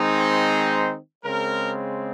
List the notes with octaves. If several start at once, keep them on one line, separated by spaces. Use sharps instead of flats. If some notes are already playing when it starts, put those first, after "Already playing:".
Already playing: D#3 G#3 C4 D#4
C5
C#3 G#3 C4 A#4